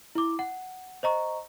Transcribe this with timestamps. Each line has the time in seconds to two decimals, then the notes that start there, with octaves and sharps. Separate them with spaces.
0.15 E4 D6
0.39 F#5
1.03 C5 D#5 A#5 C#6